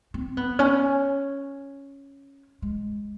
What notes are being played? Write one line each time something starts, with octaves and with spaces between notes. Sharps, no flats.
C4
B3
C#4
G#3